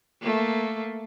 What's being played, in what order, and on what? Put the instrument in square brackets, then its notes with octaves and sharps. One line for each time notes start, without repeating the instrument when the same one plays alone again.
[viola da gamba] A3 A#3